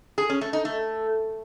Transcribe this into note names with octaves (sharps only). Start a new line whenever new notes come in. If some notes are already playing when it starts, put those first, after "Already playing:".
G#4
C#4
A3
D#4
A3